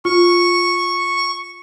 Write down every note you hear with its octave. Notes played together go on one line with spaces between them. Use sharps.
F4 C#6